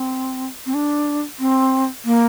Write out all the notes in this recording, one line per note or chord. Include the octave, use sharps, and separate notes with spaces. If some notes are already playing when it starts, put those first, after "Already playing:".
Already playing: C4
C4
D4
C4
A#3